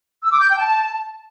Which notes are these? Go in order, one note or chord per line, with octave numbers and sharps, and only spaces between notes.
E6
D6
G6
G5
A5